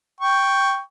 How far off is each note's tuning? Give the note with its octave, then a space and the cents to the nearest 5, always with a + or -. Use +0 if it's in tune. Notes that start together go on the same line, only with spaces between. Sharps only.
G5 +0 C#6 +0